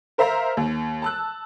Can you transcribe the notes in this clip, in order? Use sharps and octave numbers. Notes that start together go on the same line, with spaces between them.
A#4 C5 E5 F5 A#5
D#2
A5 E6 F#6